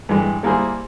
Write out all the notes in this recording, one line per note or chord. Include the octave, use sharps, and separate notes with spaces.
G2 E3 G#3
G3 A#3 E4 G#4 C5